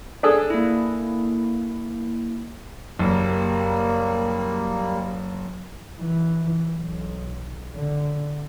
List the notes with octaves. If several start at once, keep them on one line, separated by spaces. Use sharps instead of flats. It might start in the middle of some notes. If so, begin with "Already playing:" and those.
D4 G#4 A4
A#3 E4
F#1 G3 A#3
E3
B1
D3